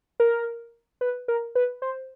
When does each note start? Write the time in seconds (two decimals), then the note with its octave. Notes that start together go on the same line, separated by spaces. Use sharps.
0.20 A#4
1.01 B4
1.28 A#4
1.55 B4
1.82 C5